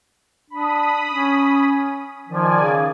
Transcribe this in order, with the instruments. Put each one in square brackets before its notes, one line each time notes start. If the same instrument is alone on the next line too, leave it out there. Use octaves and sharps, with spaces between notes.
[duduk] D4 [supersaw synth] B5 D#6
[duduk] C#4
[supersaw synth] D#3 D5 G#5 [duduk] F3
[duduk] C#3